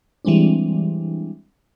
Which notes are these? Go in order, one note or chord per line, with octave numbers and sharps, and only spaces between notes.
E3 G3 G#3 C4 D4